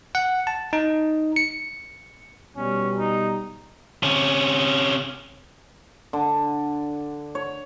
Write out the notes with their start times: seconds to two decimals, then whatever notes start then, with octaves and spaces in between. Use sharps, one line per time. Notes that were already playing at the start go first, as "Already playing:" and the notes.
0.15 F#5
0.47 A5
0.73 D#4
1.36 C#7
2.56 B2 G3 C#4
2.99 D#4
4.03 C3 C#4
6.13 D3
7.35 C#5